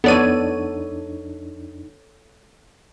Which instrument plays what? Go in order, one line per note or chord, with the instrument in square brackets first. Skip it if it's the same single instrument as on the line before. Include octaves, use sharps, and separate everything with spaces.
[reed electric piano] F2 D4 D#4 [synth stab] B3 D5 D#7 [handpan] A4 C#5